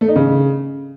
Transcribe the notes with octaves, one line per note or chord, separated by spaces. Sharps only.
A3
D#4
C#3